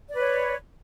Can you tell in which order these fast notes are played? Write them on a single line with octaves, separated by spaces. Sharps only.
D5 B4 C#5